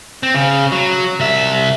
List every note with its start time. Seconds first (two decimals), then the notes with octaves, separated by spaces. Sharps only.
0.23 C4
0.34 C#3
0.72 F#3
1.20 C2 E5